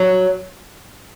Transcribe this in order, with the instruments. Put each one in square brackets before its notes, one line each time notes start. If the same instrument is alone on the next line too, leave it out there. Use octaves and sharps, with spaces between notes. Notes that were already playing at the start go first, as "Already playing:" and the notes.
Already playing: [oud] F#3